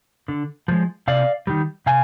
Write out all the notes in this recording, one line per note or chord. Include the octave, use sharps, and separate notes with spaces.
D3
F3 G#3
C3 D5 F5
D#3 G3
C3 F5 G#5